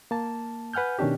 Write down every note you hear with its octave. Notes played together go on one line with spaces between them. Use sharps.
A#3 A5
B4 F#5 G#5 F6 G6
B2 D#3 C#4 D4 G4